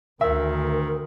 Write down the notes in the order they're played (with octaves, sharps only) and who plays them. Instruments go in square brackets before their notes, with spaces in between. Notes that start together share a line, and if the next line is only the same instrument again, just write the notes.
[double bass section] D2 [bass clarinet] D#3 [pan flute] A#4 [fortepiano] E5